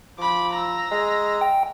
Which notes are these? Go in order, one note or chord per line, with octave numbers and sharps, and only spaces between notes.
F3 B5 D6
A#5 E6
G#3
G5